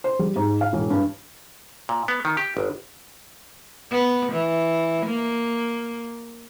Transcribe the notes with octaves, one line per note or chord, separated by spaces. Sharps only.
C5
G3
G#2
F5
E1
G2
A#2
B3
D#3
G4
G1
B3
E3
A#3